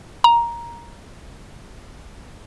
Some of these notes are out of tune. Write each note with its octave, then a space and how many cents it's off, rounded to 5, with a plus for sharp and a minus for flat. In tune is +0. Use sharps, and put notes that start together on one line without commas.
A#5 +10